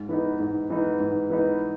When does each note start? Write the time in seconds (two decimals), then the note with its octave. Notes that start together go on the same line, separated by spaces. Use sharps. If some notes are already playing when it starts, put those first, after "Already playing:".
Already playing: G#2
0.09 E3 B3 D#4
0.40 G#2
0.70 E3 B3 D#4
1.00 G#2
1.30 E3 B3 D#4